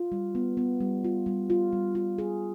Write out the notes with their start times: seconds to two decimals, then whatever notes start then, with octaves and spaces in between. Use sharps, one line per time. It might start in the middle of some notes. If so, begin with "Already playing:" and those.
Already playing: F4
0.12 G3
0.35 B3
0.57 B3
0.81 G3
1.04 F4
1.26 G3
1.50 F4
1.73 G3
1.95 F4
2.18 G#4